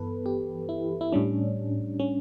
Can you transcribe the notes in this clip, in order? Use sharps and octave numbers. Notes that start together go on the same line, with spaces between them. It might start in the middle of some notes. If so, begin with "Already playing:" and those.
Already playing: G2 E3 B3 A4 B4
G4
E4
E4
A2 G3 C#4 D4
C#4